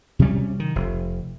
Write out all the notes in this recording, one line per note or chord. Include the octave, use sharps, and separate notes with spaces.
C3 F#3 G3 C#4
D#3
F1